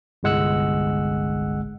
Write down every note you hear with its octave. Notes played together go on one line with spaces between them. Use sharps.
G1 C2 G#3 F#5 E6 F#6